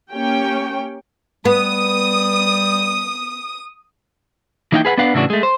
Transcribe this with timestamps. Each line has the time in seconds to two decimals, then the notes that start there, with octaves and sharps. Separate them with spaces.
0.10 A#3 C#4 G4 C#5 G5
1.45 G3 B3 D#6
4.72 E3 A#3 D#4 E4 F5 G5
4.85 G#4 B4 F5 F#5
4.98 B3 D4 B4 F5 F#5
5.14 A2 C#3 E3 D4 F#4
5.30 G#3 A3
5.43 C5